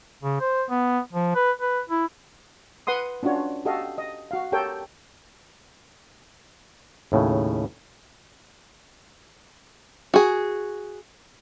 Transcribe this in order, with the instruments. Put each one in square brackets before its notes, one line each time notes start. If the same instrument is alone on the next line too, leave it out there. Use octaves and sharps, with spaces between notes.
[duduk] C#3
C5
B3
F3
B4
B4
E4
[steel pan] B4 F#5 C6 D#6
C#4 D4 F4 F#4 C#5
F#4 G4 A4 D#5 F5
D#5
F#4 F5
G4 A4 A#4 C#5 G5
[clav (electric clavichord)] D#2 A2 C#3
[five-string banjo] F#4 G#4